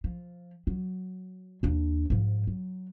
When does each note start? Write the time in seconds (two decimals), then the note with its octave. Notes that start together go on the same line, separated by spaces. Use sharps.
0.04 F3
0.67 F#3
1.63 D#2 D4
2.10 G#2 F3
2.47 F#3